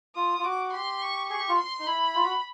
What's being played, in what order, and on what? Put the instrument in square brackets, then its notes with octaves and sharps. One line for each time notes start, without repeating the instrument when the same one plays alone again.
[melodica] F4 [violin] D#6
[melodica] F4
[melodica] F#4 [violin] D6
[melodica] G4 [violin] C6
[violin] C#6
[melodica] G#4 [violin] C#6
[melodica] G4
F4
[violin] C6
[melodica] D#4
[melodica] E4 [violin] B5
[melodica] F4
F#4